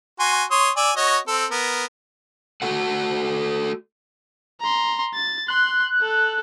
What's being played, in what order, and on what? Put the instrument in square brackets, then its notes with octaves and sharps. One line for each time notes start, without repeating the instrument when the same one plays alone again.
[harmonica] F#4 G#5 C6
C#5 C6 D#6
D5 G#5 E6
F#4 C#5 D#5
C4 A4
B3 A#4
[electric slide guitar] A3 F#4 A4 F#5
[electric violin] A#5 C6
A6
[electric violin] C6 [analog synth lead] F#6
[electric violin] A4